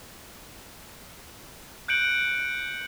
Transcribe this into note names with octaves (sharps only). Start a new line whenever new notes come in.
F#6 G6 C#7 D7 F#7